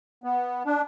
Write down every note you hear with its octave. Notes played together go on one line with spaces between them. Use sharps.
B3
D4